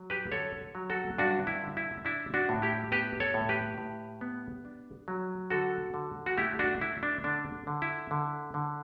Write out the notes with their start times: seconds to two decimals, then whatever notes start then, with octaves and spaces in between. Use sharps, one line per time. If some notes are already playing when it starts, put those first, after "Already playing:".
Already playing: F#3
0.10 G4 B4
0.32 D3 A4 C#5
0.75 F#3
0.90 F#4 A4
1.18 G2 D4 F#4
1.47 E4
1.62 D3
1.77 E4
2.05 D4 E4
2.34 D4 F#4
2.49 A2
2.62 E4 G4
2.91 B3 G4 B4
3.20 A4 C#5
3.34 A2
3.49 G4 B4
3.78 A2
4.21 B3
4.65 D4
5.08 F#3
5.50 D3 F#4 A4
5.94 D3
6.26 F#4
6.37 A3 E4 G4
6.59 D4 F#4
6.81 A3 E4
7.03 D4
7.24 D3 D4
7.67 D3
7.82 E4
8.11 D3
8.54 D3